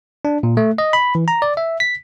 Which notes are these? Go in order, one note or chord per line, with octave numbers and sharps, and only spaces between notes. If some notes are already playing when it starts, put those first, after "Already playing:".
D4
A#2
A3
D#5
B5
E3
A#5
D5
E5
B6